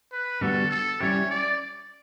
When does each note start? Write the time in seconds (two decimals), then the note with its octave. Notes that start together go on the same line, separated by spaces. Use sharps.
0.12 B4
0.41 D3 G3 B3 F#4 A4
0.71 A4
1.01 G3 C#4 E4 G4 C#5
1.30 D5